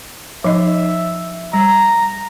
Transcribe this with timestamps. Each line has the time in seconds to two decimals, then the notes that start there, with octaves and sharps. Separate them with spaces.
0.44 F3 D#4 D#5 E5
1.53 G3 A#5